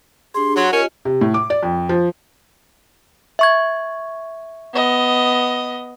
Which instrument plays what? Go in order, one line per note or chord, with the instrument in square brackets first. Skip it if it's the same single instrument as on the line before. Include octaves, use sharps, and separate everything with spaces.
[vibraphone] D4 G4 G#4 [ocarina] C6
[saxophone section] F#3 [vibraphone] F#5 [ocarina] C6
[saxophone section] C#4 [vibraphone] F4 G4 D#5 [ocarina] A#4
[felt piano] C3
A2
D6
D5
F2
F3
[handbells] E5 C#6 G#6
[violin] B3 D#5